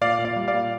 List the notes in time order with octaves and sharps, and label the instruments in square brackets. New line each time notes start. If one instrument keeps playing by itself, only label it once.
[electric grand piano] A#2 D5 F5
A#2
D5 F5
G3
D5 F5
A#2